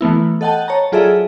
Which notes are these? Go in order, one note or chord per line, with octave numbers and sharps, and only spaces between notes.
E3 A3 B3 E4
A4 D#5 F#5 G5 A5
C#5 A5 A#5
F#3 F4 G#4 A4 D5 E5